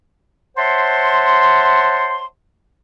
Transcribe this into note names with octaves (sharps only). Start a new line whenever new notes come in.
C5 C#5 E5 F#5 A5 C6